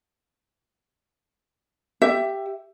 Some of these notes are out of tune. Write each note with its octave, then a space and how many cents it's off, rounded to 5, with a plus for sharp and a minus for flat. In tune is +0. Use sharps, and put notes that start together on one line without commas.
G4 +0 E5 +15